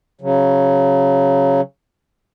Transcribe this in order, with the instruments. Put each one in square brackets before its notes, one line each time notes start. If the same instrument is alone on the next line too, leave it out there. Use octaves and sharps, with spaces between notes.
[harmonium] C#3 F#3